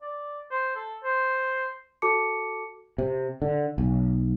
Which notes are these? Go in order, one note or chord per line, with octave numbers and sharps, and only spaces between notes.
D5
C5
A4
C5
F#4 A4 A5 D6 C#7
C3
D3
B1